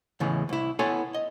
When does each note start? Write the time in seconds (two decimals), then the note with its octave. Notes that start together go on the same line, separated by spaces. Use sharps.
0.20 E2 A2 C#3 E3 G#3
0.49 C2 E4
0.79 B3 E4 A4 C#5 G#5 C6
1.14 D#5